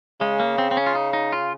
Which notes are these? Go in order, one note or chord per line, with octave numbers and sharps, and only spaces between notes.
C#3 G#3
A#3
C4
C4
C#4
F4
D#4
D#4
F4